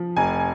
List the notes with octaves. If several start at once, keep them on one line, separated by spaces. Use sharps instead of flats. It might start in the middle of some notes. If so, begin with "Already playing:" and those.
Already playing: F3
F1 G#5